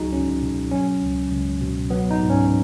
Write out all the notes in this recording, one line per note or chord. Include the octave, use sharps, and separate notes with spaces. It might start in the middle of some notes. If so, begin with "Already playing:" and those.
Already playing: C#2 F#3 D#4 F#4 G#4
C#2 C#4
B2
F#3 C#4
C#2
C#2
B2
F#3 B3
D#4
G#2
C#4